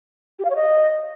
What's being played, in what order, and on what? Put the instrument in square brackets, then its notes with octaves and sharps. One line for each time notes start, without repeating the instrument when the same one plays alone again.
[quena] G4
F5
C#5
D#5